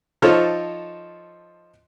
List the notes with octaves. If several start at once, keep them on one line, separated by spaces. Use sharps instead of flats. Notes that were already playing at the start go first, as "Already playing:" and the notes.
F3 D#4 F4 A4 C5 C#5